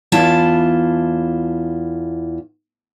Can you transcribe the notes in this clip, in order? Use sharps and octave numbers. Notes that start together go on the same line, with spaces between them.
E2 E4 F4 A5